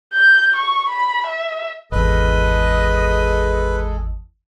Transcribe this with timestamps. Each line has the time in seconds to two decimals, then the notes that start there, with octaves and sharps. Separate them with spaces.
0.14 G6
0.56 C#6
0.89 B5
1.27 E5
1.92 G#1 E2 G#3 G#4 A4 B4 D#5